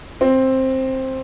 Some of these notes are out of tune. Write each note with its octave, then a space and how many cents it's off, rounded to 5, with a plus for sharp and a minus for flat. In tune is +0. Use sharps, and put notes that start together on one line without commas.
C4 +10